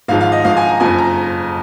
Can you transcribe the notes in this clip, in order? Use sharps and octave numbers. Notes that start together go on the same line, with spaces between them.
G#1 G#2 F3 F5
F5
D#5
G#1 G#2 F3 F5
G#5
A#5
F#1 F2 F3 G#5
A#5